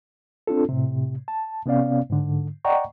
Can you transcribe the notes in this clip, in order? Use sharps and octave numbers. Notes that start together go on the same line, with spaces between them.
C4 D4 F4 A4
A2 C3
A5
C3 B3 C#4 D5 F5
G#2 D3
D5 D#5 F#5 G5 A#5 C#6